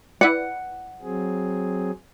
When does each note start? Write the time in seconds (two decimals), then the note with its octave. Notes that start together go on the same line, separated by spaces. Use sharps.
0.21 E4 B4 D5 F#5
1.02 F#3 C4 G#4